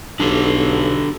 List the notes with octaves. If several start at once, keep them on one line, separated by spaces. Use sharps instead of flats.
B1 D4 G4 A4